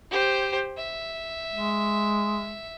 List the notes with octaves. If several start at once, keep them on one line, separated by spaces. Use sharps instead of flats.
G4 C5
E5
G#3